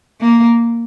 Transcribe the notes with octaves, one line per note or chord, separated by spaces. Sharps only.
A#3